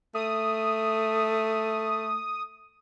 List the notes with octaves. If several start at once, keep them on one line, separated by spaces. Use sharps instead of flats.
A3 D#6